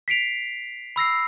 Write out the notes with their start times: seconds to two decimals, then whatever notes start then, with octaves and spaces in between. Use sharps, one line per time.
0.08 B6 C7 D7 F7
0.96 B5 E6 A#6 C7